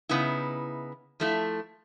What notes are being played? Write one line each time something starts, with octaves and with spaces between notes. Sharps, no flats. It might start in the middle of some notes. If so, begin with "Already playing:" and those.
C#3 B3 D#4 E4
F3 A3 E4